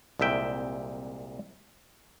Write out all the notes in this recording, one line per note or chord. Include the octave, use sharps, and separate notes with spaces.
C2 A#2 G#3 E5 G5